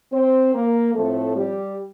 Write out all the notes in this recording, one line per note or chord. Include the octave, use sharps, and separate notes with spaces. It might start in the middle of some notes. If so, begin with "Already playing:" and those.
C4 C5
A#3 A#4
A2 F3 A3 C4 A4
G3 G4